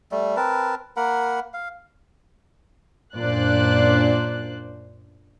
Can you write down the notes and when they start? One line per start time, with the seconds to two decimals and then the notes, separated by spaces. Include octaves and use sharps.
0.12 G3 A3
0.37 C4 A#4 B4 A5
0.97 A#3 A#4 F#5 B5
1.53 F5
3.16 F#2 A#2 D4 C5 D5 F#6